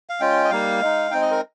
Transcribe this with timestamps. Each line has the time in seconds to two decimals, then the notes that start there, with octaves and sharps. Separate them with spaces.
0.10 F5
0.20 G#3 C#4 F4 G5
0.44 D#5
0.50 G3 A#3 D#4 F5
0.81 G#3 D#4
1.11 G#3 C4 D#4 G5
1.21 D#5
1.31 A#4